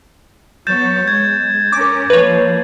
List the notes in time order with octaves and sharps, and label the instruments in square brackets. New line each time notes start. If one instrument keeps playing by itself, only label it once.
[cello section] F#3 B3 C#5 [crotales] G6 A6 E7
[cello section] G#3 [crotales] G#6
[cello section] C#4 A#4 [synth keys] D6
[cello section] F3 A#3 [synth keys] B4 C#5